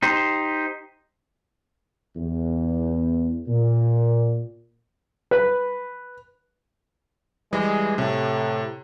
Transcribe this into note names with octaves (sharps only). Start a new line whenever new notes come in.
D#4 G4 C5
E2
A#2
B4
E3 G3 G#3 D#5
A2 C3